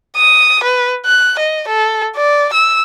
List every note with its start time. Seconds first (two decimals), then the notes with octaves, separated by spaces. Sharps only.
0.16 D#6
0.64 B4
1.06 F#6
1.39 D#5
1.68 A4
2.16 D5
2.54 E6